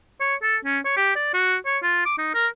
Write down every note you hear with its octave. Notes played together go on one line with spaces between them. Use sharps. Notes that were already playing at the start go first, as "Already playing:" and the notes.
C#5
A4
C#4
C#5
G4
D5
F#4
C#5
F4
D6
D#4
A#4